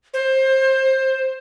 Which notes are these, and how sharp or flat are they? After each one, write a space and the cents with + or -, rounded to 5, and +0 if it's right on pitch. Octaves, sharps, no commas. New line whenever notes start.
C5 +20